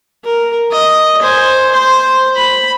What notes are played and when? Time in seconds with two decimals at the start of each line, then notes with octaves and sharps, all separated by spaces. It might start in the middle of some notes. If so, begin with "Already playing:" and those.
0.24 A#4
0.71 D#5
1.21 C5 G#5
1.72 C5
2.36 B5